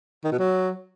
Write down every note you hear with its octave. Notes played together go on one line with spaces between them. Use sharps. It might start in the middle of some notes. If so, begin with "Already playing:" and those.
D#3
B2
F#3